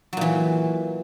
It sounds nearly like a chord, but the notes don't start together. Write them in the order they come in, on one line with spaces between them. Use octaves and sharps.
F#3 A#2 E3